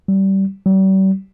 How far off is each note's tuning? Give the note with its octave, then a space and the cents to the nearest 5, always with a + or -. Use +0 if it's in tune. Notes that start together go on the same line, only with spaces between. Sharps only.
G3 -20
G3 -40